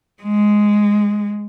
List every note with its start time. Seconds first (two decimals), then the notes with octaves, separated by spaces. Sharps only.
0.23 G#3